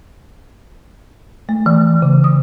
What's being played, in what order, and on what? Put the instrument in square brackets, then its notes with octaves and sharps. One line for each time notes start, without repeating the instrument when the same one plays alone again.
[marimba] A3
E3
C#3
D#6